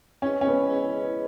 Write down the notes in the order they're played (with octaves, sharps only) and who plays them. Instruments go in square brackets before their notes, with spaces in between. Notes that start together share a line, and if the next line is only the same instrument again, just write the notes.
[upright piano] C#4 [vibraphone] E4 G#4 B4 D#5
[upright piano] C#4
B3
[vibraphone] E4 G#4 B4 D#5